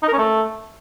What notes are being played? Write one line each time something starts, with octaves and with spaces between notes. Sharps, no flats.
D#4
A#4
C#4
A3